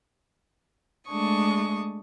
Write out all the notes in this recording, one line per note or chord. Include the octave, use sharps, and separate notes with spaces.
G#3 A3 D4 C#6 D#6